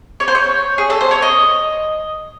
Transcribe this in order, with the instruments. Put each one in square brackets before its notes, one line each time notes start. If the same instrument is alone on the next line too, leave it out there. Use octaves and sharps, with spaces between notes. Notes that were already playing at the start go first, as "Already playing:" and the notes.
[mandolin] C#5
C5
C#5
G#4
A4
C5
C#5
D#5